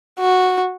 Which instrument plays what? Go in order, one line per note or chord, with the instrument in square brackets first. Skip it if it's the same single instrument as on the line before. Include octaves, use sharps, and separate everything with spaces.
[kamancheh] F#4